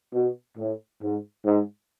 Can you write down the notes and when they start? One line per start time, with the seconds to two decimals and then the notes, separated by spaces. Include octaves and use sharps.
0.14 B2
0.58 A2
1.02 G#2
1.46 G#2